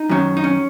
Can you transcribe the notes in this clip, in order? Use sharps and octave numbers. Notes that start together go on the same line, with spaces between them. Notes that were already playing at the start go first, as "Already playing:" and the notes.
Already playing: D#4
F#2 D#3 F#3 C#4
D#4
C#4